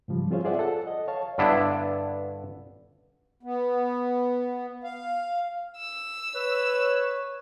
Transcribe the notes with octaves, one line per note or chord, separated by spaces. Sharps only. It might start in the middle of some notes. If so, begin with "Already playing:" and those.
G#2 C#3 F3 G3
C4 F4 G#4 C5 C#5 F5
F4 G#4 C5 D5 E5 F#5
A4 F#5
D#5
C#5 F5 A5
G2 D3 B3 D4 E4
B3
F5
E6
B4 C#5